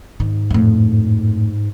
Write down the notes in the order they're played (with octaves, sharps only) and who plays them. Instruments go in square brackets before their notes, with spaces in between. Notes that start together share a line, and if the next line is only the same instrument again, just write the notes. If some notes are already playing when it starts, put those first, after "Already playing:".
[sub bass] G#2 [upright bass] D#3
[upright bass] F2 A2